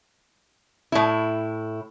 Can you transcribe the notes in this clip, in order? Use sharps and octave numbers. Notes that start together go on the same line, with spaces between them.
A2 E4